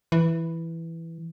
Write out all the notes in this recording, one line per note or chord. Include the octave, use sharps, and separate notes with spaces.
E3